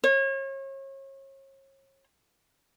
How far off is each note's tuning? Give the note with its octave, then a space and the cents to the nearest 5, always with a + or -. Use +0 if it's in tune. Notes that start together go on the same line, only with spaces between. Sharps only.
C#5 -35